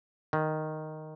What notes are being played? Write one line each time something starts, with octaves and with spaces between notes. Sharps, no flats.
D#3